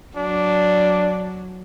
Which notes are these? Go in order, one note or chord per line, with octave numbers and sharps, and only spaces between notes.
F#3 D4